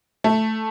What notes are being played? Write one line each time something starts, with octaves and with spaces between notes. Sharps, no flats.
A3